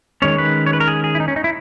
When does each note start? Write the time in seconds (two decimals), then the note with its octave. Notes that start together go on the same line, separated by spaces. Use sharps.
0.22 D#3 G#3 C#4 C#5
0.38 B4
0.66 C#5
0.73 B4
0.80 A#4
0.88 G#4
1.04 G#4
1.15 E4
1.20 D#4
1.28 C#4
1.36 D#4
1.44 E4